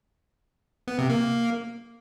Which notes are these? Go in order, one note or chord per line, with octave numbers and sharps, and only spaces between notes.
B3
C3
A#3